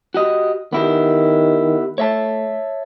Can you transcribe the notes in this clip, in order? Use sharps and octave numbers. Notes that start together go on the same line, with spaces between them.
F#4 G4 D#5
D#3 B3 E4 G4
A3 C#5 E5 A5